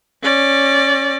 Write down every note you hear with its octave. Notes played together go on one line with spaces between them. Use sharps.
C#4 D5